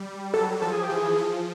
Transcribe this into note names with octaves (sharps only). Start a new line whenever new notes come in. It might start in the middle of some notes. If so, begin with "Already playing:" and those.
Already playing: G3
F#3 A4
F3 A4
G#4
G4
E3 G#4
F3